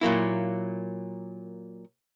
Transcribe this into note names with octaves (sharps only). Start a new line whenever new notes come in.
A#2 F#3 A#3 E4